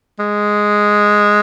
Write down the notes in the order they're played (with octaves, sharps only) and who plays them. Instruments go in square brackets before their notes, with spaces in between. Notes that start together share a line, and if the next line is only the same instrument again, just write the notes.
[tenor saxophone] G#3